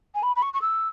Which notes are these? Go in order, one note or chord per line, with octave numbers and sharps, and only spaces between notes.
G#5
B5
B5
C#6
C#6
E6